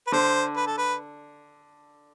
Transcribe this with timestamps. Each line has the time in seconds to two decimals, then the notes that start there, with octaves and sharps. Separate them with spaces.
0.07 B4
0.12 D3 C5
0.56 B4
0.67 A4
0.78 B4